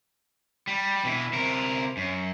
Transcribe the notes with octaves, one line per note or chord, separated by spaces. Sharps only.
G3
B2 E3
C3 A#4
F#2